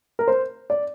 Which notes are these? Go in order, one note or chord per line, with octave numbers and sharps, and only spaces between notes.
A#4
C5
D5